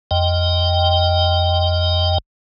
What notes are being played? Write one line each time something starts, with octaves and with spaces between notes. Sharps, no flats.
F2 D#5 G5